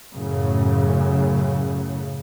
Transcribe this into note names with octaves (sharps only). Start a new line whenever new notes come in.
F#2 A2 C#3